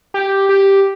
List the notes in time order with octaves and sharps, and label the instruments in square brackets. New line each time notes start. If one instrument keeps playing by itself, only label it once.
[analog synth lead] G4
G4